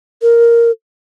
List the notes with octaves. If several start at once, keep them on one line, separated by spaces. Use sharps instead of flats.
A#4